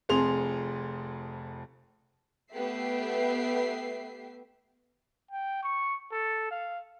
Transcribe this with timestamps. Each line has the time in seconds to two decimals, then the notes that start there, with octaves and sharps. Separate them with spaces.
0.09 F1 F2 G#4 C6 F7
2.53 A3 B3 G4 E5 C7
5.31 G5
5.63 C#6
6.12 A4
6.51 F5